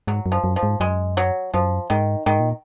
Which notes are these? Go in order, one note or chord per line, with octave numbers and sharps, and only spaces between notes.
G#2 F#3
F#2
F3
F#2
F3
G#2
F#2 G#3
F#3
F#2 F3
G#2 D#3
G#2 D#3
A#2